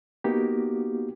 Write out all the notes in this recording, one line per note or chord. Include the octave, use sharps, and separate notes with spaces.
A#3 B3 D#4 F#4 G4